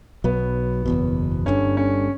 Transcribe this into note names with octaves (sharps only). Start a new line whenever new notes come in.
B1 B2 F#3 B3
F#1 E2 B2
G1 G2 D3 C#4
C#4